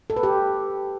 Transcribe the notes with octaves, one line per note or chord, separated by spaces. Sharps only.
A4
B4
G4